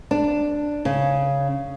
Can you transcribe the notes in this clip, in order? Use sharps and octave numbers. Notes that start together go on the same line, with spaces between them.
D4
C#3